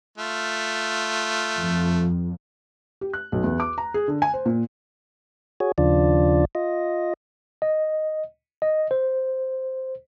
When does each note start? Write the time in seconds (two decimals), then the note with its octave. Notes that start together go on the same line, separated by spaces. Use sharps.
0.18 A3 F4
1.60 F2
3.01 G4
3.13 F#6
3.32 B1
3.44 E2
3.60 D6
3.78 A#5
3.94 G#4
4.08 D3
4.22 G#5
4.34 C5
4.46 A#2
5.60 F#4 G#4 C#5
5.78 D#2 C#3 F3 D4 F4 D5
6.55 F4 D#5
7.62 D#5
8.62 D#5
8.91 C5